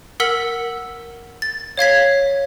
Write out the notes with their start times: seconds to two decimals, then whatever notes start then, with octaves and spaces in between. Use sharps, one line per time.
0.20 A#4 F#5 E6 B6 F#7
1.42 A6
1.77 C#5 F5 G#6 B6